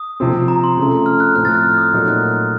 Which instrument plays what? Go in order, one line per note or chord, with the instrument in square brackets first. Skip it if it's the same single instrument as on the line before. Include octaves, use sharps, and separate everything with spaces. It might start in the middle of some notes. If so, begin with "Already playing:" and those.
Already playing: [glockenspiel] D#6
[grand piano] C3 F3 C4
[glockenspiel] A#5
C6
[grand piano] C#3 F3 A3
[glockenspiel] F6
F#6
[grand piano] A2 F3 C4 [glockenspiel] F#6
[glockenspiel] F6 A6
F#6
F6
D#6
[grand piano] A#2 F#3 A3 D#4
[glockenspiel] F#6